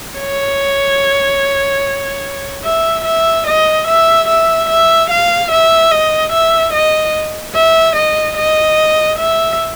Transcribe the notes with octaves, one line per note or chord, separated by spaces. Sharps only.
C#5
E5
E5
D#5
E5
E5
E5
F5
E5
D#5
E5
D#5
E5
D#5
D#5
E5